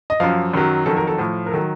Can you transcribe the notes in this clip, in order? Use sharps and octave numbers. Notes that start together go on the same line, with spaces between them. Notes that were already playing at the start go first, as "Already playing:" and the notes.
D#5
F#2 F3 F5
F#2 D#3 F#3
F2 D#3 F#3 A4
A#4
A4
A2 F3
A#4
D#3 F#3 A4